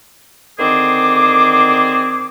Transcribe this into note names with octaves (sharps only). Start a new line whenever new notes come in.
D3 D#3 C4 G#4 C5 D6